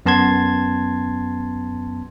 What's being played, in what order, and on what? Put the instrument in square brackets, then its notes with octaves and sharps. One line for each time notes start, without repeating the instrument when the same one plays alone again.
[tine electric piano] F#2 B3 A5 C6 G#6